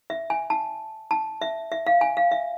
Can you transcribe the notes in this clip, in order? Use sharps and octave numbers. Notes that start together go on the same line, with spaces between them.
E5
G#5
A5
A5
E5
E5
F5
G#5
F5
E5